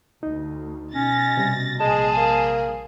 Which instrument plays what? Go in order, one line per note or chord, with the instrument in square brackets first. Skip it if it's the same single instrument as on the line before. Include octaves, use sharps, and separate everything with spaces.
[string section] D2 [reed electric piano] D#4
[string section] B2 A6 A#6 [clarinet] C#4
[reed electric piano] C3 G3
[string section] A#1 G#4 C5 [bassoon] G#3 [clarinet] A5
[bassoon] A#3